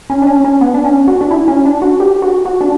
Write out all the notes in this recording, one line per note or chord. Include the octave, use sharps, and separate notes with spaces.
C#4
D4
C#4
C#4
B3
D4
C#4
F#4
D4
E4
C#4
D4
F#4
G4
F#4
F#4
D4